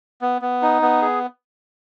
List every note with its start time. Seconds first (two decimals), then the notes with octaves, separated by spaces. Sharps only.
0.21 B3
0.42 B3
0.62 D#4
0.82 B3
1.02 G#4